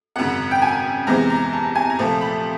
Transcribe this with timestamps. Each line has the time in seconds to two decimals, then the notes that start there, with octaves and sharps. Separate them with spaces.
0.16 G#1 F#2 C#3 F#5
0.51 G5
0.62 G#5
1.07 E2 C3 E3 G#3 C4 A#5
1.30 A#5
1.53 A5
1.75 G#5
1.90 A#5
1.99 C2 A#2 F3 A3 A5
2.21 B5